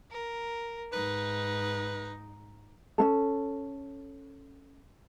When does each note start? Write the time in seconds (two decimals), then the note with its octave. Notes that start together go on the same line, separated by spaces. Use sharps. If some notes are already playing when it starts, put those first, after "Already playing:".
0.11 A#4
0.93 G#2 D#4 B4
2.98 C#4 D4 A4